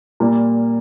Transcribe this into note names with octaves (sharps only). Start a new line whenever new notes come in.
A#2 G3 A#3